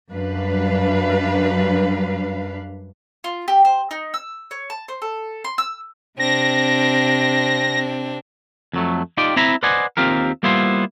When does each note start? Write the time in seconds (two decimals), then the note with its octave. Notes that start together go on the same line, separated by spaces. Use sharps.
0.11 F#2 G3 D4 B4 F5
3.24 F4
3.48 G4
3.65 C5
3.91 D#4
4.14 E6
4.51 C#5
4.70 A5
4.88 C5
5.02 A4
5.44 C6
5.58 E6
6.20 C3 C4 D4 A#6
8.73 F2 F#3 A3
9.17 D#4 F4 G4 D5 G5
9.36 C4 E4 A#5 B5
9.63 B4 C5 D5 D#5 F#5 G#5
9.97 D#2 C4 F4 G4 A#4
10.43 G3 A#3 B3 E4 F4 C5